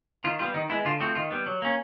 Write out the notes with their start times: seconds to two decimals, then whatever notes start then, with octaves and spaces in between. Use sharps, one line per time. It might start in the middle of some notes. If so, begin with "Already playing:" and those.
0.24 D#3 F4
0.39 G3 B3 F4
0.54 D#3 D#4
0.69 G#3 B3 E4
0.85 D3 F4
1.00 F3 A3 C4 F#4
1.15 D#3 F4
1.31 G3 B3
1.46 F#3
1.62 A#3 C#4